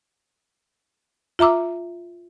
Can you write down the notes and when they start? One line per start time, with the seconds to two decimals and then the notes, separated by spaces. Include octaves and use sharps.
1.39 F4 E5 A#5 D6 E6